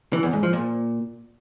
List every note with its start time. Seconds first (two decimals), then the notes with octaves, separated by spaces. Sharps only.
0.13 E3
0.23 E2
0.33 G#2
0.43 F3
0.53 A#2